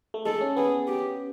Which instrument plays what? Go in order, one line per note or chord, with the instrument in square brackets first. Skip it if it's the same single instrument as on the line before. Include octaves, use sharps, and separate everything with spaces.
[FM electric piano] A3
[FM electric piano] G#3 [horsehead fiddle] A4
[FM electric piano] C#4
[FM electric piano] B3 [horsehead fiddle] G#4
[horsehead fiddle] G4